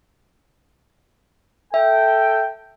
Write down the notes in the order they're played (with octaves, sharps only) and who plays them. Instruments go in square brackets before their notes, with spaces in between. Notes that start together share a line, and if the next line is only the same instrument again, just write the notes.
[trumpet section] A4 G5 [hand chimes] E5